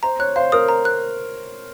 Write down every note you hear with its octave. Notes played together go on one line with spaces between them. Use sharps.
C5 A#5
C#5 F#6
C5 F5
A#4 D#6
A#5
F#6